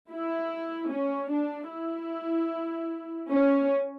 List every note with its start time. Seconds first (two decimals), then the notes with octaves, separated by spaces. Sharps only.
0.10 E4
0.90 C#4
1.31 D4
1.71 E4
3.32 C#4